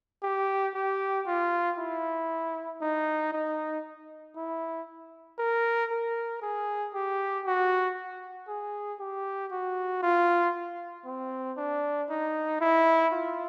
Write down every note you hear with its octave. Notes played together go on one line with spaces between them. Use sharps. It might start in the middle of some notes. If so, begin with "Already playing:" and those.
G4
G4
F4
E4
D#4
D#4
E4
A#4
A#4
G#4
G4
F#4
G#4
G4
F#4
F4
C4
D4
D#4
E4
F4